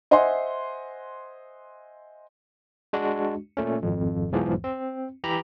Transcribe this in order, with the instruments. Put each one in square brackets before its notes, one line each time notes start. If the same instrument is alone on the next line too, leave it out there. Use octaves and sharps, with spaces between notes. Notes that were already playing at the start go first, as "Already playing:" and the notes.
[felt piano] C5 D#5 E5 F#5 G#5 C6
[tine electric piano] G#3 D4 F#4
A#2 A3 C#4
G#1 F2
B1 E2 G#2 E3 F3
C4
E3 G4 A#5 B5